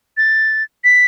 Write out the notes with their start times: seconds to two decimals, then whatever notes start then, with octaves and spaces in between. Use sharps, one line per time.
0.17 A6
0.84 B6